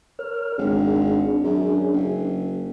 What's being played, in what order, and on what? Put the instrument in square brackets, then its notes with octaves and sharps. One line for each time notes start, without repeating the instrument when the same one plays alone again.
[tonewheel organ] A#4 C#5 F6
[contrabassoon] G#1 [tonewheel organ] D4 G#4
[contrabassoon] F#2
F#1